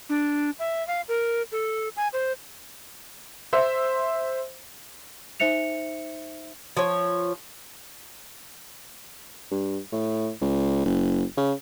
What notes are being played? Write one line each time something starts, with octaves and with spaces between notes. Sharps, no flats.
D4
E5
F5
A#4
A4
G#5
C5
C5 E5
D#4 C5 E5 C#7 F7
F3 C#5
G2
A2
C#2
F#1
C#3